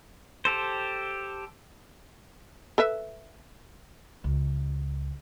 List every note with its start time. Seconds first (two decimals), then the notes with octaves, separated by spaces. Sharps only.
0.45 G4 A4 C5
2.78 A4 B4 E5
4.24 C#2